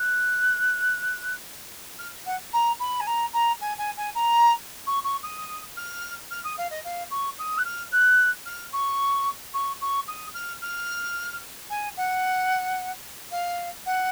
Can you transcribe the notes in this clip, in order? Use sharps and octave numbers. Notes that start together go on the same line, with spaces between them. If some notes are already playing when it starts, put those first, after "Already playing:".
Already playing: F#6
F6
F#5
A#5
B5
G#5
A#5
A#5
G#5
G#5
G#5
A#5
C#6
C#6
D#6
F6
F6
D#6
F5
D#5
F5
C#6
D#6
F#6
F6
F#6
F6
C#6
C#6
C#6
D#6
F6
F6
G#5
F#5
F5
F#5